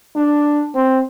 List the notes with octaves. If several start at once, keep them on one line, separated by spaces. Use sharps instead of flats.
D4
C4